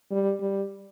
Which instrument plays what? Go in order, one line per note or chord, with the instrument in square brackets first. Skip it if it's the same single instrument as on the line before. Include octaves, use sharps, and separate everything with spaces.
[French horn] G3
G3